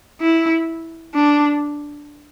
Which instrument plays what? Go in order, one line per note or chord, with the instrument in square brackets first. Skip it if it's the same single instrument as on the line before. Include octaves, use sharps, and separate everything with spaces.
[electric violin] E4
D4